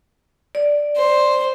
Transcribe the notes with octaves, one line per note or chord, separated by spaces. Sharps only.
D5
C5